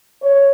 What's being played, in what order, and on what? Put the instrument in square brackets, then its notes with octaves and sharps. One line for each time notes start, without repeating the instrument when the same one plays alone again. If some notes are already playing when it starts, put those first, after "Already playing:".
[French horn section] C#5